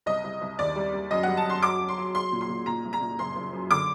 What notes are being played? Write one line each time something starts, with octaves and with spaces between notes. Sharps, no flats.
C2 D#5
C2
C2
D#2 D5
G3
G3
F#2 D#5
G3 F#5
A5
F#2 C6
F#3 D6
F#3
C6
F#3
F#3 C6
A#2
C6
A#2
A#2 A#5
C2
A#5
A#2
F#1 C6
F#1
F#2
D3 D6